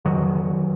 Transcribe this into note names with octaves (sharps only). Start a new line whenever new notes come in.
F2 D#3 F#3
D3